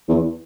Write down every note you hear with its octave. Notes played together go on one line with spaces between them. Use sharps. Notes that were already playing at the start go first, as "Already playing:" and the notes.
E2